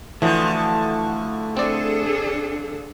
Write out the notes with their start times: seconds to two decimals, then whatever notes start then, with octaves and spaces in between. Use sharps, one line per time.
0.22 D3 E3 F3 A3 E4 F#4
1.57 C4 D4 G#4 A4 D5